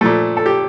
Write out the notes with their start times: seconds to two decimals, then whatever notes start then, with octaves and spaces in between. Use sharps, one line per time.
0.01 A#2 F3 A3 A4
0.37 A4
0.46 G4